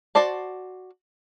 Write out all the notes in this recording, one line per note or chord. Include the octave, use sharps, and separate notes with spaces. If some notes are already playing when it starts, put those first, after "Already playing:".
F#4 C5 D5 A5